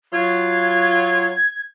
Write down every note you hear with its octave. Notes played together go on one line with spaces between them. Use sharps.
F#3 F4 G#6